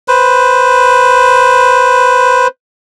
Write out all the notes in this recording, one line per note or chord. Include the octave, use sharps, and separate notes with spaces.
B4 C5